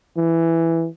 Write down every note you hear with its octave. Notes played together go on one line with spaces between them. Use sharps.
E3